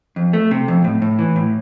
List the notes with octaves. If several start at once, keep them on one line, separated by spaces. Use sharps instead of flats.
F2
A3
C3
F2
A2
A2
E3
A2